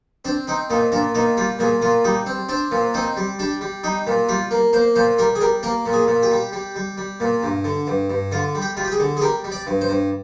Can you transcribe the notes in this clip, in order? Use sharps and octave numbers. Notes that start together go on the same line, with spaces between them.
C4 D4
C4 D#4
A#2 D#4
A#2 D4
A#2 D#4
G3 F4
A#2 G#4
A#2 F4
G3 D#4
C4
C4 D4
A#2
C4 D#4
G3
G3 D4
G3
G3 D#4
A#2
G3 F4
A#3
A#3 C5
A#2 C5
G3 A#4
G#4
G3 A#4
A#3 A#4
A#2
G#4
A#2
G4
G3
G3
G3
G3
A#2
G2
D3
G2
G2
D3 F4
G3
G4
G3 F4
G4
G#4
D3
G#4
G3 A#4
G3
D5
G2
C5
G2